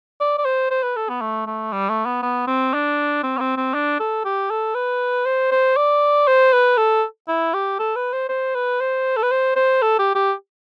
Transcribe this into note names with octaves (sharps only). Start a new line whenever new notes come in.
D5
D5
C5
C5
B4
A4
B3
A3
A3
G3
A3
B3
B3
C4
D4
C4
B3
C4
C4
D4
A4
G4
A4
B4
C5
C5
D5
C5
B4
A4
E4
G4
A4
B4
C5
C5
B4
C5
A4
B4
C5
C5
A4
G4
G4